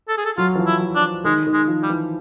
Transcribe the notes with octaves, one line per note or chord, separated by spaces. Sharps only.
A4
G#4
A4
F#3 F4
E3
F3
E4
F3
D4
D#3 G#3
D#3
G#3
F3
G3
E3